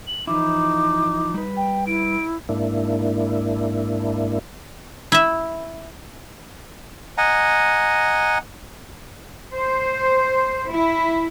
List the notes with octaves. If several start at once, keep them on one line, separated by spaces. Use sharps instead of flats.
F#7
E3 F3 D#4 E4 D6
G3 B4
G5
E4 D7
G#2 A#3 D4 E4
E4 E5
D#5 F#5 G#5 A#5
C5
E4